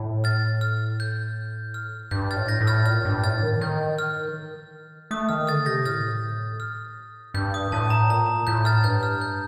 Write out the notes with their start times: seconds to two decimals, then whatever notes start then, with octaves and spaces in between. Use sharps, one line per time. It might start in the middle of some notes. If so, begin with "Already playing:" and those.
Already playing: A2
0.24 F6 A6
0.61 F6
1.00 G6
1.74 F6
2.11 G2 G6
2.31 F6 A6
2.36 A2
2.48 G6 A#6
2.61 A2
2.67 F6 A6
2.86 A#2 F6 A6
3.05 G2
3.24 A2 F6 A6
3.43 D#3
3.61 D#3 G6
3.98 F6
5.11 A3 D#6
5.29 D#3 F6
5.47 D3 F6 A6
5.66 C3 G6 A#6
5.85 A2 F6 A6
6.60 F6
7.34 G2 G6
7.54 D#6
7.72 A2 A5
7.90 A#5
8.10 A#2 A#5
8.47 A2 G6
8.65 F6 A6
8.84 G2 G6
9.03 F6
9.21 G6